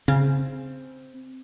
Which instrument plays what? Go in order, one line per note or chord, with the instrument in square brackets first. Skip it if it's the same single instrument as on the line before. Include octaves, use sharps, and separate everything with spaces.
[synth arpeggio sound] C#3 [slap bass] C4